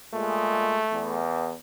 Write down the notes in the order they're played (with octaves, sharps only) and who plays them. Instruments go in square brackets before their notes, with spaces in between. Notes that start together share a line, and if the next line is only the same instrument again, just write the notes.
[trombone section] A#2 G#3 [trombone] A3
[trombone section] E2